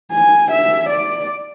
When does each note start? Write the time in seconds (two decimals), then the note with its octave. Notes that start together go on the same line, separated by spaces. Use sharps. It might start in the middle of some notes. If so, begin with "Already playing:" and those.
0.12 G#5
0.51 E5
0.89 D5